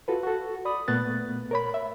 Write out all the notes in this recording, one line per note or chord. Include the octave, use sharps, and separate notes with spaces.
F4 F#4 A4 B4
F#4 A4
D5 B5 D#6
A#2 A3 B3 F#6 A6
A#4 C#5 B5
E5